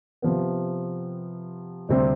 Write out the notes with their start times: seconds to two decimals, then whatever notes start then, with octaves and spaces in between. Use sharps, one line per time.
0.22 C3 F3 B3
1.89 D2 C3 G3 C4